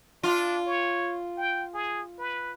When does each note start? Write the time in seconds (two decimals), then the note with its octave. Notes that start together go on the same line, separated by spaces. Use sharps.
0.23 D4 F4
0.66 C#5
1.37 G5
1.74 G#4
2.19 B4